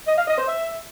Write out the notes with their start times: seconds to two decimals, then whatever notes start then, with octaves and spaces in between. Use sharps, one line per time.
0.07 D#5
0.17 F5
0.28 D#5
0.38 C5
0.48 E5